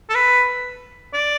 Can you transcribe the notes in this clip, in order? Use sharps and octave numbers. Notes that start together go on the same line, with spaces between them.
A4
B4
D5